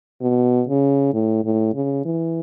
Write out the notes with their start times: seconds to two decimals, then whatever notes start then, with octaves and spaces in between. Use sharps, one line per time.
0.22 B2
0.68 C#3
1.13 A2
1.45 A2
1.74 C#3
2.05 E3